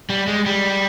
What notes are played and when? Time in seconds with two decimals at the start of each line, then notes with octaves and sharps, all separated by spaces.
0.10 G3
0.27 G#3
0.46 G3